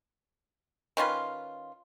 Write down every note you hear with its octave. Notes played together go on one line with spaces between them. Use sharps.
D#3 C#4 F4 B4